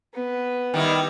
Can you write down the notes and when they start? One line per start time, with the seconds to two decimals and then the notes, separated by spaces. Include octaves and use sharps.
0.15 B3
0.74 D#3 G3 E4